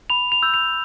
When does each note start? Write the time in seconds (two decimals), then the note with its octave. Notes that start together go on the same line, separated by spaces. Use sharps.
0.10 B5 F7
0.32 F7
0.43 E6 G6
0.54 F7